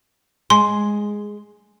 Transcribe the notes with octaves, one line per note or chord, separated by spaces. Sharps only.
G#3 C6